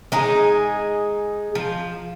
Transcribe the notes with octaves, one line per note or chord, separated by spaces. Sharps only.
G#3 D#4 G#4
F3